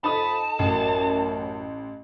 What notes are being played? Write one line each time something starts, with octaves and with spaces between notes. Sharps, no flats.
F2 D#4 A4 A5 B5 D#6
A1 F#2